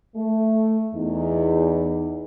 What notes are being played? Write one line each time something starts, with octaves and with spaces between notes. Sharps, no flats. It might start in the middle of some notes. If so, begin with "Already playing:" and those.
A3
E2 D#4